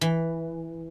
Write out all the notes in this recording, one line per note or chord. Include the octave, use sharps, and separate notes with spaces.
E3